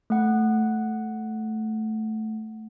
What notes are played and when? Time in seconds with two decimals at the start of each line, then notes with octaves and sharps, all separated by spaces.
0.10 A3 F#5